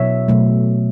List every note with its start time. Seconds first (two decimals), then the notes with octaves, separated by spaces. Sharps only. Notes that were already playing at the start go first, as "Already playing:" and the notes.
Already playing: B2 F#3 C#5 E5
0.28 B2 F#3 A3